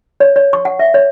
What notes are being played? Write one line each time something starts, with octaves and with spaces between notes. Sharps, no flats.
C#5
C#5
C#6
F#5
E5
C#5